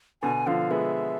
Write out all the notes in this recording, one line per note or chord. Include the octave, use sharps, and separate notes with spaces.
B2 D3 G#5
D3 F3 F5
G#3 B3 E5